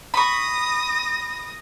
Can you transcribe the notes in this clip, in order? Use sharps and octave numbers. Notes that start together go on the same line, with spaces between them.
B5 C#6 D#6 A#6